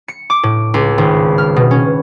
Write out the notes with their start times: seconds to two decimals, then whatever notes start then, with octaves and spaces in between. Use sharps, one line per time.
0.08 C#7
0.30 D6
0.43 A2
0.74 C#2
0.98 G#1
1.38 F6
1.56 B2
1.71 C#4